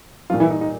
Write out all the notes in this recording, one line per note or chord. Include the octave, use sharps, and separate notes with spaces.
A#2 F3 G3 F4
E3 E4
D#4
D#4